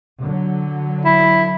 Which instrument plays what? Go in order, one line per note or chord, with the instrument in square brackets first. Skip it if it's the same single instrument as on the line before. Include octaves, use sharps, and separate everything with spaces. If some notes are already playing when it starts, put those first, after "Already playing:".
[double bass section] D3 F#3
[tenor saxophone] E4